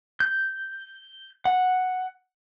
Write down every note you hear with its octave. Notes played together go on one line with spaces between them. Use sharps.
G6
F#5